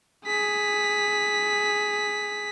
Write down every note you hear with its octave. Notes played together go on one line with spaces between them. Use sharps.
G#4 B6